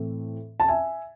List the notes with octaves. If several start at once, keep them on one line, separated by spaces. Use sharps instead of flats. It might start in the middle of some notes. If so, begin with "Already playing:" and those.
Already playing: A2 E3 A3 C4
A5
E5 G#5